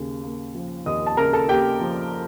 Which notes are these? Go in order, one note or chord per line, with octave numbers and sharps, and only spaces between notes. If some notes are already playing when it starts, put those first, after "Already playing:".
Already playing: D#2 C#3
A#3
F3
D#2 D#5 D#6
A5
C#3 A#4 A#5
A4 A5
A#3 G4 G5
F3